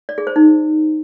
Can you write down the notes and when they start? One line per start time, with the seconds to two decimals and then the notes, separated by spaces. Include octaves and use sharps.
0.09 D5
0.18 G#4
0.27 C5
0.36 D#4